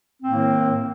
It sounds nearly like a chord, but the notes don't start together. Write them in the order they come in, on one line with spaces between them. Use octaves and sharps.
C4 A2 A#3 D#3